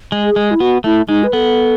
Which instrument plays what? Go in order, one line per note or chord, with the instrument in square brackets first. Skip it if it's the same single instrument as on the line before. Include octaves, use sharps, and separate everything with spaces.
[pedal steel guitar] G#3
[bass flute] G#4
[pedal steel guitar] G#3
[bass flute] E4
[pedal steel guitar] B3 [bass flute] F#4
[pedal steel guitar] A3 [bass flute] E4
[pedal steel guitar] G#3 [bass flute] D#4
[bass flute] B4
[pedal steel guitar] B3 [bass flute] A4